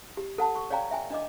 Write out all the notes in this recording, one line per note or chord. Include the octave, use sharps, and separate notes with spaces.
G4
A4 F#5 A5
C#6
C#5 D5 F5 G5 A#5
E5 G5 G#5
D4 D#5 D6